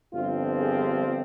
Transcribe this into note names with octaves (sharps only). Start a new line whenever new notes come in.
G1 G2 F3 C4 F4
G#4